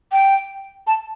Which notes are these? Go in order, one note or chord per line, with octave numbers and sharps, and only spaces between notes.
G5
A5